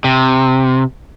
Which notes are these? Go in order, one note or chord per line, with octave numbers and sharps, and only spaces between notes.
C3